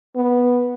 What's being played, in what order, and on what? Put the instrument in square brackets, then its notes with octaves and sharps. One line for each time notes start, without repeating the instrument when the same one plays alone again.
[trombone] B3